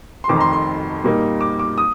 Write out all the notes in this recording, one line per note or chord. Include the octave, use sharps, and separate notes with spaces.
C6
F1 F2 D#3 D6
A#5
C6
C6
A#2 G3 A#3 D#4
D6
D6
D#6